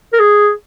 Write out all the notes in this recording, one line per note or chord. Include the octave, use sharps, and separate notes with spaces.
A#4
G#4